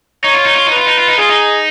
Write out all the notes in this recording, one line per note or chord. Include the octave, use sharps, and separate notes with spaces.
D#4 C#5
F4
D#4
F4
D#4 B4
F4
D#4
F4
D#4
F4 G#4
D#4